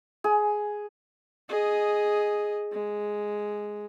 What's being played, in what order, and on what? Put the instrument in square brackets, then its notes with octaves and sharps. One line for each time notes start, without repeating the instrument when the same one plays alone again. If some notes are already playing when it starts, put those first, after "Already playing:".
[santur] G#4
[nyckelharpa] G#4 D#5
G#3